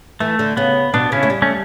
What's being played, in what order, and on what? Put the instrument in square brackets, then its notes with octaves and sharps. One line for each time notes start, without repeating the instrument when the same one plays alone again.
[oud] E3 [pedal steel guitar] A3
[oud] D3
[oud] C#3 [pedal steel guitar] B3
[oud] B2 [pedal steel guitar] B3 D4
[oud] C#3 [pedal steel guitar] C#4 E4
[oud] A3
G3
[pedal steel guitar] A3 C#4